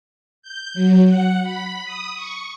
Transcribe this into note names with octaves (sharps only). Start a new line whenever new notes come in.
G6
F#3
F#5
B5
D#6
C#6